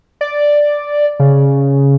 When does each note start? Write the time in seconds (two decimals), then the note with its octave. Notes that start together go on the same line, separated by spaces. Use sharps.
0.21 D5
1.20 C#3